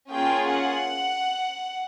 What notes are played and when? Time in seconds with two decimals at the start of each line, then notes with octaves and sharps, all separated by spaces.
0.13 A#3 C#4 F4 G#4 G5
0.53 F#5